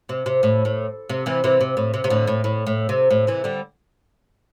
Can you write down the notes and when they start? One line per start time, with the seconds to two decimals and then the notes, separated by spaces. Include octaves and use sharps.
0.09 C3
0.26 C3
0.43 A2
0.65 A2
1.09 C3
1.26 C3 E3
1.44 C3 E3
1.61 C3
1.77 A2
1.94 C3
2.04 C3
2.10 A2 D3
2.27 A2
2.44 A2
2.67 A2
2.89 C3
3.11 A2
3.27 C3 E3
3.44 D3 G3